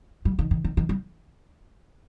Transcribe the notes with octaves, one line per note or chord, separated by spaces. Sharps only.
G3
D#3
D#3
D#3
D#3
G3